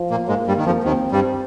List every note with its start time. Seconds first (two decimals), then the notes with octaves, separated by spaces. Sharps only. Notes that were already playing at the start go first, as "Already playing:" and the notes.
Already playing: F3
0.10 A#2 A#3
0.29 G#2 G#3 A#3
0.47 G2 G3
0.57 D#3
0.66 F2 F3
0.84 D#2 D#3 C4
1.12 G2 G3